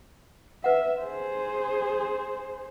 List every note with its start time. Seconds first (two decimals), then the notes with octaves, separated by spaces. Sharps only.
0.64 B4 E5 F#5
1.01 G#4 C5